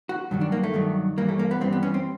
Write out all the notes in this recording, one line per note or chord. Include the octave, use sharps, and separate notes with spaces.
F#4
G2 D#3 F#3
D4
A#3
A3
G2 D#3 F#3
G2 E3 G3 A#3
A3
A#3
B3
G2 E3 G3 C4
B3
C#4
C4